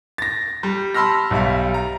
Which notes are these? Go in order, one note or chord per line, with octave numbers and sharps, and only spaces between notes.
A6 A#6
G3
A5 B5 C6 E6 F6 A#6
B1 G3 E5 F5
A#5